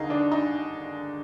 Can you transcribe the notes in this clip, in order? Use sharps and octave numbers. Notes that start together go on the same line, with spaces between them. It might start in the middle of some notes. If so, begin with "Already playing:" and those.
Already playing: D#2 D3 D#4 G#4 A#4
D4
D#4